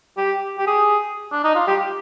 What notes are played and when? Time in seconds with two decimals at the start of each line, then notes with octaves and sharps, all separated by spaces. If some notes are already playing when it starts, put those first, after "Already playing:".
0.17 G4
0.58 G4
0.67 G#4
1.32 D4
1.44 D#4
1.55 F4
1.67 G4